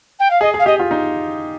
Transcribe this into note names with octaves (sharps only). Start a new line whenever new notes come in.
G5
F5
G#4 D#5
G#4
F5
G4 D#5
F4
D#4